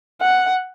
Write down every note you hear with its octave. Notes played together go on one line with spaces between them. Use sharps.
F#5